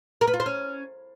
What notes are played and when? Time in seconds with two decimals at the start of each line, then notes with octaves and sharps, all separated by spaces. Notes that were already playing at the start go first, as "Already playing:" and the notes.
0.21 A#4
0.27 B4
0.34 F4
0.40 C5
0.46 C#4